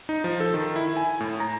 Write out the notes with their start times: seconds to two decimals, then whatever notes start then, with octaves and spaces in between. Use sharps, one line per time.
0.09 D#4
0.24 F3
0.40 A4
0.54 D#3
0.76 E4
0.97 G#5
1.20 A2
1.40 A#5